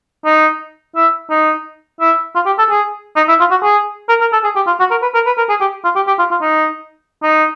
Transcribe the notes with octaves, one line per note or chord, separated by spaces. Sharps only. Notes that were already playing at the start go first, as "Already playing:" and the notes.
D#4
E4
D#4
E4
F4
G4
A4
G#4
D#4
E4
F4
F#4
G#4
A#4
A#4
A4
G#4
G4
F4
F#4
A#4
B4
A#4
B4
A#4
G#4
G4
F4
G4
G4
F4
F4
D#4
D#4